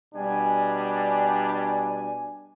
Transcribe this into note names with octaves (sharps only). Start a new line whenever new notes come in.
B2 G3 D4 G#5